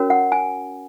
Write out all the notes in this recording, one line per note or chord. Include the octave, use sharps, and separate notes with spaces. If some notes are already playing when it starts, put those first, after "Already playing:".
Already playing: C#4 F#4 A#4 C#5
F#5
G#5